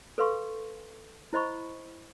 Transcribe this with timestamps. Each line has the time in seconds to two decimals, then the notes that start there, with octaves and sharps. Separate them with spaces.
0.18 A4 B4 F5 C6 C#6
1.33 E4 C5 D#5 B5 C#6